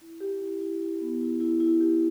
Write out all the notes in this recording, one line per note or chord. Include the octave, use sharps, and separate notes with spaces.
E4
G4
E4
E4
E4
B3
E4
E4
E4
G4